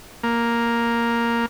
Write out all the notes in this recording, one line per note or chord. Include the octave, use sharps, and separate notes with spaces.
A#3